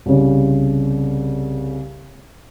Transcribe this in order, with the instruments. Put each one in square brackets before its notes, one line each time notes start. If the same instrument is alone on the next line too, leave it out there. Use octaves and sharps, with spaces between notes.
[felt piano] C2 C#3